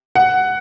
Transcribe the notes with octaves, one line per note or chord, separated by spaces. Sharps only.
F#5